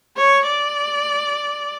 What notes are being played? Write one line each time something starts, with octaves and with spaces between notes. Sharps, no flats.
C#5
D5